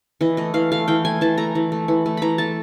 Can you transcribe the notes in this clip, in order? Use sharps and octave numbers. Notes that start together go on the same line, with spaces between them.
E3 D#5
A3 D#5
E3 F5
A3 F5
E3 G5
A3 G#5
E3 A5
A3 A#5
E3
A3
E3
A3
E3 A#5 B5
A3 A5